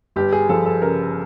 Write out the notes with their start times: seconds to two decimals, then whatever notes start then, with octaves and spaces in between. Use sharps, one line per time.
0.16 G1 G4
0.32 G#4
0.49 F3 A4
0.66 A4
0.82 C#3 A#4